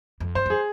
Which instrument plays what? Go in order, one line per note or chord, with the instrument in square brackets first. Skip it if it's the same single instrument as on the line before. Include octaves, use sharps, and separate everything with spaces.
[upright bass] F2
[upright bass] G2 [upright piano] C5
[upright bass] F2
[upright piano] G#4